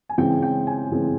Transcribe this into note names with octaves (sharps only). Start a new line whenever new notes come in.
G#5
C#3 E3 G#3 C4 G5
G5
G#5
C#3 E3 G#3 C4